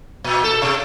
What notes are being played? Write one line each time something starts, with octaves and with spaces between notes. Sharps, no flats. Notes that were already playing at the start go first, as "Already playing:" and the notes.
A#2
A4
C3